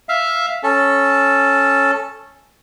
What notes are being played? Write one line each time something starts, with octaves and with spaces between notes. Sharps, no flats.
E5 F5
C#4 A4